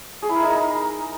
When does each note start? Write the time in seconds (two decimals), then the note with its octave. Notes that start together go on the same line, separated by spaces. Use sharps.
0.22 G#4
0.29 E4
0.36 A#4
0.43 D#4
0.49 A#4